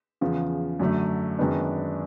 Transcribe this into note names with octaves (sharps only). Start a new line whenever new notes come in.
E2 C#3 F3
F#2 D3 F#3 A3
F#2 D#3 G#3 B3 D4